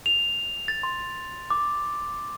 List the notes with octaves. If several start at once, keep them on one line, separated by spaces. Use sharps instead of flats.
F7
A6
C6
D6